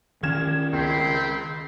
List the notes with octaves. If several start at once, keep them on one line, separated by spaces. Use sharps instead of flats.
D#3 C#4 F6 G#6 E7
C#2 C4 B5 C6